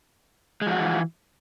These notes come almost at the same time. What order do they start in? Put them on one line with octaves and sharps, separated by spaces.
G#3 F3 F#4 F4 E3